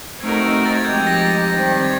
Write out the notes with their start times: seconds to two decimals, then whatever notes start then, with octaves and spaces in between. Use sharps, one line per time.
0.20 A3 C4 D#4 F#4 A#4 G#6
0.66 A6
0.76 G#6
0.84 F3 G#3 C4 D#4 G4 G6
0.96 G#6
1.07 A#6
1.17 A6
1.51 D#3 G3 C4
1.83 G#6